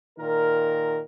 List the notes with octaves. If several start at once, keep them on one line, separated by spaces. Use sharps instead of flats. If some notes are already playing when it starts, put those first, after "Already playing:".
A#2 D#3 A#4